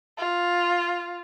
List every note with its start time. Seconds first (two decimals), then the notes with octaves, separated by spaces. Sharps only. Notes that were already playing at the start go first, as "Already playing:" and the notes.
0.18 F4